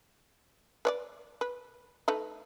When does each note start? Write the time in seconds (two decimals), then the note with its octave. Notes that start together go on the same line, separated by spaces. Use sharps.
0.85 B4 C#5 D5
1.41 B4
2.08 A3 D#4 B4